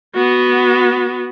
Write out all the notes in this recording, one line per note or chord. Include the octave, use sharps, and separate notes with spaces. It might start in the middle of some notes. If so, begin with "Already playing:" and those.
B3 F#4